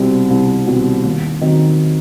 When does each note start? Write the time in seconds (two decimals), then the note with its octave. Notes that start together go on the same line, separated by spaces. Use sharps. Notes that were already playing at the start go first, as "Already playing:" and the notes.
Already playing: C2 B2 G3 C4
0.30 C2
0.67 B2 G3 C4
1.04 D#2
1.41 D#3 F#3 C4 D#4